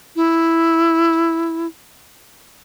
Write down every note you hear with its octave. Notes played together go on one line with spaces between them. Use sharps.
E4